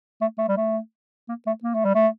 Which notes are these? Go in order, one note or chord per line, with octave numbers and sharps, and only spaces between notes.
A3
A3
G3
A3
A#3
A3
A#3
A3
G3
A3